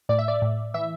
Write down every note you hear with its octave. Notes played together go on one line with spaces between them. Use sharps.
A2 D5
E5
D5
A2
E3 E5